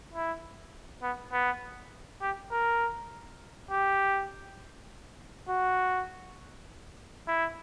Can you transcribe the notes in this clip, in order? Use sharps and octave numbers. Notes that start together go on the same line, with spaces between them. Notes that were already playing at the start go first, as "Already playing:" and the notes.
E4
B3
B3
G4
A#4
G4
F#4
E4